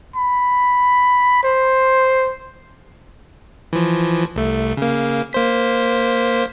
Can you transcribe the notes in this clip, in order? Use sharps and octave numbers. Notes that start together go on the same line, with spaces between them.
B5
C5
E3 F3
C2 A3
C#3 A#3
A#3 C5 B6